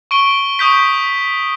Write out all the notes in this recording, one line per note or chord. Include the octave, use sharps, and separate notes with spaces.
C#6 D7 G7
C#6 D#6 G6 B6